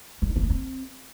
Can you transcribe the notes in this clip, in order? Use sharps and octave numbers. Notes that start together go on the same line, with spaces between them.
G3
D#4
C4
B3
C4